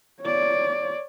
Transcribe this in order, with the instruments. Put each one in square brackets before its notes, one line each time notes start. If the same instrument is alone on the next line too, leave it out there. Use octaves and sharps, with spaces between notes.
[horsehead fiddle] C#5 D5